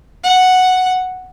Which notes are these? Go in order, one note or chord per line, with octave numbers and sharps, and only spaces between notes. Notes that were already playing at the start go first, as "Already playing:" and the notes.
F#5